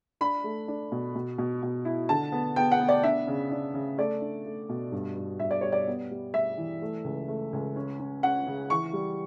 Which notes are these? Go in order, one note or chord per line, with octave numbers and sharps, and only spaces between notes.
D4 B5
A3
D4
B2
B2
B2
B2
E4
D3 A5
B3
B3 G5
F#5
B3
D5
D4 E5
C#3
D4
C#3
A3 D5
D4
A3
B2
G2
G2
G2 E5
D5
G3 C#5
D5
B3
G3
G3 E5
E3
A3
C#2
A3
C#2
C#4
C#4
C#4 F#5
C#3
E3 C#6
G3